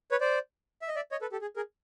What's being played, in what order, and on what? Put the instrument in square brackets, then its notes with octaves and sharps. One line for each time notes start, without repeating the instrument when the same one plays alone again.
[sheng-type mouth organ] B4 C#5
C5 D5
E5
D#5
D5 E5
C#5 D#5
A4 B4
G4 A4
G#4
G#4 A#4